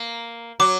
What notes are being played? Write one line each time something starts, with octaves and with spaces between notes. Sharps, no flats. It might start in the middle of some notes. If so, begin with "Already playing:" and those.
Already playing: A#3
F#3 D6